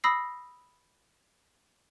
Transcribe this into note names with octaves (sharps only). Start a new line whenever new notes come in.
B5 D#6 E6 A#6 C7